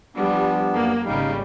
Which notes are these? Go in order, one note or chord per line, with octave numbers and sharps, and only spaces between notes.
F3 G3 B3 D4
F#2 A#3
G#1 C#3 G3 D#4 F5